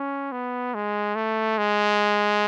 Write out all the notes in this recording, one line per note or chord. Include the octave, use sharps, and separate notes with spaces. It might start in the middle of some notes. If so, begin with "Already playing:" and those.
Already playing: C#4
B3
G#3
A3
G#3